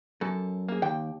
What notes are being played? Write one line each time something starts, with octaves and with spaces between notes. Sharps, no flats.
F#2 A4
A#3 G#4
D#2 G5